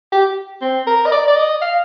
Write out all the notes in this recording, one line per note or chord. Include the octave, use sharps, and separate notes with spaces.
G4
C4
A#4
D#5
D5
D5
D#5
F5